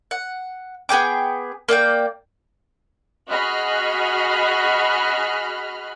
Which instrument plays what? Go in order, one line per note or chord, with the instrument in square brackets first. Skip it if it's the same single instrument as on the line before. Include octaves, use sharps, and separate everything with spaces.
[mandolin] F#5
B3 G#4 G5 D6
A#3 D5 F5 G5
[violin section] F#4 G#4 D#5 B5 F6 F#6